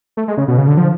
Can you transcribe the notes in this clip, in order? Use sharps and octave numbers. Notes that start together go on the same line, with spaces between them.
A3
G#3
C#3
B2
C#3
D3
F3